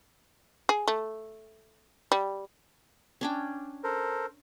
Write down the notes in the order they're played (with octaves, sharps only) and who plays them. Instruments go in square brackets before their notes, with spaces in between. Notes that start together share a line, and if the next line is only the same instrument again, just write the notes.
[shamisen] G#4
A3
G3
[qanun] C#4 D4 G5
[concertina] A4 A#4 C5